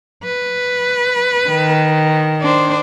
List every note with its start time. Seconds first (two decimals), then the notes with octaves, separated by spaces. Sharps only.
0.24 B4
1.49 D#3
2.42 D4 C5